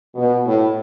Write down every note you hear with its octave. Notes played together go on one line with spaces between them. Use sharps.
B2
A2